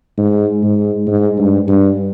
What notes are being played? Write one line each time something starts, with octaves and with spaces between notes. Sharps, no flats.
G#2
G#2
G#2
G2
G2